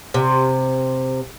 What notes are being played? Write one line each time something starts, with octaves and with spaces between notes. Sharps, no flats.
C3